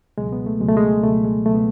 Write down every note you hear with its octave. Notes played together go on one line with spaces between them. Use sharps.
C#2 B2 F#3 G#3
B3
A3
C#2 B2 F#3 G#3
A3
G#3
C#2 B2 F#3 A3
G#3
C#2 B2 F#3 A3
B3